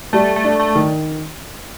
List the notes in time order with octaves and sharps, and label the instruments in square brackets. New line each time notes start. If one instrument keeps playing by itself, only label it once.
[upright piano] G3 [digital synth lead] A3
[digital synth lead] A3
[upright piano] D4
[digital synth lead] A3
[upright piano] D#3